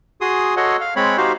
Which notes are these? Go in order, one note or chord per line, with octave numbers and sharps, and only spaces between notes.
F#4 G#4 C6 D#6
F#4 A4 C#5 D#5 F#5 C6
F5
G#3 C4 C#5 B5
D#4 F#4 G4 C5 F5